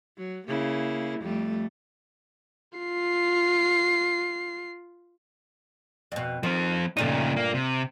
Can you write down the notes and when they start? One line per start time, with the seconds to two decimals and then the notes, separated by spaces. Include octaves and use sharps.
0.18 F#3
0.47 C#3 A#3 E4
1.20 F2 G3 A3
2.78 F4 C7
6.12 F2 B2
6.43 D#3 F3 C4
6.97 G2 A#2 C#3 A3 D#4
7.36 A#3
7.54 C3